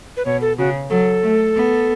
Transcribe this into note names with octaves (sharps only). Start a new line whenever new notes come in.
B4
B2 C#5
A4
C#3 F#4
F#3 A4
A3
B3